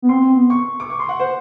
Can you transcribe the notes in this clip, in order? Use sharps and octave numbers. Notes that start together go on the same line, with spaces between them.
B3
C4 C6
C4
B3
C#6
D6
C#6
C6
F#5
C5